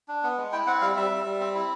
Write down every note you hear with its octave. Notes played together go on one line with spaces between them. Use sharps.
D4
B3
G#3
E4 G5
C4 F#5
G3 F5
G3 E5
G3
G3
C4
E4